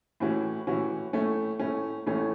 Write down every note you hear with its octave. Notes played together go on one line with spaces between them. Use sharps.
A2 E3 C#4 F#4
A2 E3 C#4 F#4
A2 A3 C#4
A2 A3 C#4
A1 A2 A3 C#4